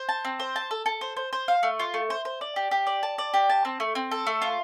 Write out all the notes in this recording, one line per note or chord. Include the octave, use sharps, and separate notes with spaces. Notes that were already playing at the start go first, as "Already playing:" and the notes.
Already playing: C5
A5
C4
C5
A5
A4
A4
C5
C5
C5
F5
A3
F4
A3
C5
C5
D5
G4
G4
D5
A5
D5
G4
A5
C4
A3
C4
A4
A3
F4